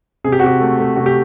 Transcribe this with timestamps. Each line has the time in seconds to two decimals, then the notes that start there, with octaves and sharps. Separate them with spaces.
0.24 C3 G#4
0.32 G4
0.40 F#4
0.44 C3 G4
0.61 A3
0.80 A3
0.96 C3 F#4
1.06 G4